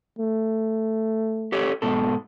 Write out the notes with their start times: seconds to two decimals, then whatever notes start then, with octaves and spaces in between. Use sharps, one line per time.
0.19 A3
1.52 G4 A4 C#5
1.82 G#2 B2 A4